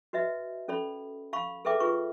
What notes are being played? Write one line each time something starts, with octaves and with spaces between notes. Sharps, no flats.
F#4 B4 D#5 E5
C#4 A4 D5 B5
F5 B5 C#6
G#4 A4 B4 E5 G5 D6
F4 G#4 B4 C#6